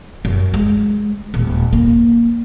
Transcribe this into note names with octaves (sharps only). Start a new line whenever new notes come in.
F#2
G#3
D#1
A#3